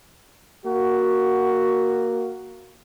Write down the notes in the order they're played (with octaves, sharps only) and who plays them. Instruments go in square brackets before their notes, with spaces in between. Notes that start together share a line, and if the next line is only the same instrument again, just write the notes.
[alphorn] A#3 [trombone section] F#4